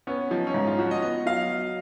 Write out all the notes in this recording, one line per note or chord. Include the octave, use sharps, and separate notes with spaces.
B3 C#4
F3 D#4
C#4
G#2 D#4
F4
F3 F#4
D#5
B3 D#5
F#3 F5